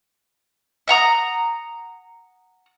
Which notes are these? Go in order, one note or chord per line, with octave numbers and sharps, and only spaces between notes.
E5 F#5 A#5 D#6